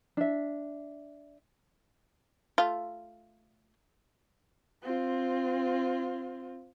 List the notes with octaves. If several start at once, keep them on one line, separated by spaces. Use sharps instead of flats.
D4 E5
A3 F4
C4 F4